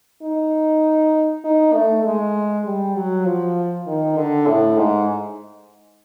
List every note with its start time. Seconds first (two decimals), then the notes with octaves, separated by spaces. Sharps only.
0.23 D#4
1.44 D#4
1.73 A3
2.05 G#3
2.65 G3
2.96 F#3
3.26 F3
3.86 D#3
4.17 D3
4.47 A2
4.77 G#2